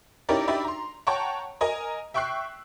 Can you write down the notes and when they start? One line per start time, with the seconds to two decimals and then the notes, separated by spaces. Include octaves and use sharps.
0.29 C#4 D#4 E4 G4 A#4 D5
0.47 D4 D#4 G4 D5 E5 B5
0.65 A#5 C6
1.07 C#5 F#5 G5 A5 A#5 C#6
1.61 A#4 D#5 G#5 A#5
2.14 E5 G5 C#6 E6 F#6 C7